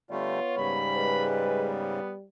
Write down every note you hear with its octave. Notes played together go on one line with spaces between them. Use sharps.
D3 G3 A3 B3 F4 C#5
G#2 C#3 G3 B5
G#3 B4
B3